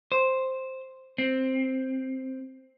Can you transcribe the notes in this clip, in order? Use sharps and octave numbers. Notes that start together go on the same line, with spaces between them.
C5
C4